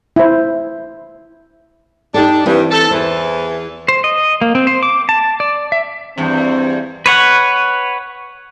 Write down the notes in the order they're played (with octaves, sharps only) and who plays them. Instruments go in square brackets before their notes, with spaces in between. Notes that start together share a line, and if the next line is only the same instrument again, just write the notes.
[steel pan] E4 C5
[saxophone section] D4 [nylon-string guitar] D#4 G4 A4
[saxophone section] G2 [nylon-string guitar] E3 C4
[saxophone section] A4
[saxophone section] E2 E3 [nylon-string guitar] C5
[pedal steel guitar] C5
D#5
A#3
C4
C5
D6
A5
D5
E5
[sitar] E2 G2 [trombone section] C4
[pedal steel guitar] B4 C#5 F#5